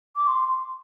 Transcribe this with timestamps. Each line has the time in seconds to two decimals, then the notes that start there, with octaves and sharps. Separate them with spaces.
0.16 D6
0.27 C6